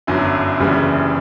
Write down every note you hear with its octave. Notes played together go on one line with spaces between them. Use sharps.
G1 F#2 D3 F#3 E4
F#1 F#2 C#3 E3 G3